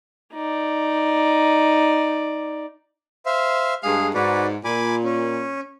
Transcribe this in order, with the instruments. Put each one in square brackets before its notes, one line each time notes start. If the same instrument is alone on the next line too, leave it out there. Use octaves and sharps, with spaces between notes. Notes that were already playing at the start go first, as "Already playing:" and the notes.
[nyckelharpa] D#4 D5
[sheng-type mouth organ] C5 E5 F5
[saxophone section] G2 G#3 F5 [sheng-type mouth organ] G#4
[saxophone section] G#2 [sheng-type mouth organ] F#4 B4 D5
[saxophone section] A#2 [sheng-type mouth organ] G#5 B5 D6
[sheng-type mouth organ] C#4